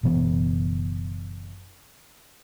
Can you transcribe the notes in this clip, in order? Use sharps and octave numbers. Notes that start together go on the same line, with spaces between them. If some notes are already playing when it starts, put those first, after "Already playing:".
F#1 B2 E3 B3